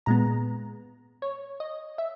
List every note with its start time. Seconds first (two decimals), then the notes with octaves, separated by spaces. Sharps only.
0.06 A#2 G#3 B3 A#5
1.22 C#5
1.60 D#5
1.98 E5